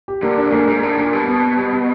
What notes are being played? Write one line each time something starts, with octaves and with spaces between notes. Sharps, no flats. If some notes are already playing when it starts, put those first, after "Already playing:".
G4
D3 A#3
D4
G#2 A#3
G#2 A#3
A2 D4
A#2 A#3
B2 G3
B3
B3
G3
B3